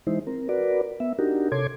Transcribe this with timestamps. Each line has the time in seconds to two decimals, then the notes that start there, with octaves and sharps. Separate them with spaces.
0.07 E3 G#3 D#4 E4 C5
0.27 C4 A#4
0.49 F#4 A#4 B4 D5
1.00 B3 E5
1.19 D4 D#4 F#4 G4 A#4
1.52 C3 A4 C#5 C6 D6 G#6